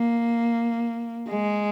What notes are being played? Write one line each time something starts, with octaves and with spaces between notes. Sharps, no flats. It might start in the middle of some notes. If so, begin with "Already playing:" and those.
Already playing: A#3
G#3